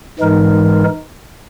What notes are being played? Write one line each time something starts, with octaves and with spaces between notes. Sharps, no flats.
G#2 E3 G#3 D#4 A#4